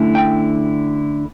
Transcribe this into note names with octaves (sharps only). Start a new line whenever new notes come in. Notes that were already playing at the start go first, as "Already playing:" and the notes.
Already playing: D3 A3 C#4 E4
G5